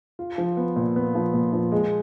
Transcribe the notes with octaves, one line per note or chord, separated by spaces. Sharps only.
F4
F3
B3
A#2
B3
F3
A#2
F3
G#3